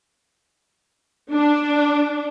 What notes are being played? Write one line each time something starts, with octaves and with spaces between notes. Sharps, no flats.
D4